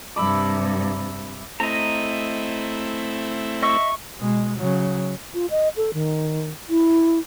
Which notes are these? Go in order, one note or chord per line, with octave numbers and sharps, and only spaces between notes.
G2 C3 E5 B5 D6
A3 C4 E4 D#5 A#5
D#5 E5 C#6 E6
B2 G#3
C#3 F#3
F4
D#5
A4
D#3
E4